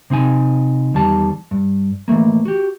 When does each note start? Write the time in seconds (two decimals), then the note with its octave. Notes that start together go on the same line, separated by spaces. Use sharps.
0.10 C3 C4 D#4 G#5
0.94 E2 D#3 G3 A5
1.51 G2
2.08 E3 F3 A3 A#3
2.45 F#4 G4